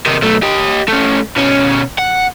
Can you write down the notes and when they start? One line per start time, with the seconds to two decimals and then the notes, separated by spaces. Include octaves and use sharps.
0.06 C3 D#3
0.22 B1 A3
0.43 G4 D#5
0.88 A3 C#4
1.36 B2 C#4
1.98 F#5